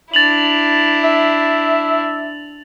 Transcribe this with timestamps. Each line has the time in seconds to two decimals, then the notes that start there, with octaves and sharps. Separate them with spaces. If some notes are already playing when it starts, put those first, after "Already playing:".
0.14 D4 E4 A6 F7 F#7
1.04 E5